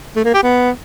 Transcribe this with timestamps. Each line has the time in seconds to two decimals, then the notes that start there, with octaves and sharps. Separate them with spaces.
0.16 A3
0.25 A#3
0.34 G4
0.43 B3